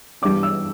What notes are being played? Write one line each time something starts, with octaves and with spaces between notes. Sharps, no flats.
G2 E3 G3 B3 D4 D6
E6